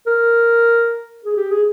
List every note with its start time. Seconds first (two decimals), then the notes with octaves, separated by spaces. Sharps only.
0.07 A#4
1.25 G#4
1.37 G4
1.51 G#4